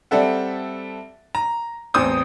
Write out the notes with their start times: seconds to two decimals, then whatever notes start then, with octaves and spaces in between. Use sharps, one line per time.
0.11 G3 C4 A4 E5 F#5
1.35 A#5
1.94 A1 E2 C4 C5 D#6 G6